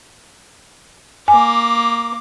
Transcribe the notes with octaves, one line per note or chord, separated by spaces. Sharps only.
A#3 G#5 D6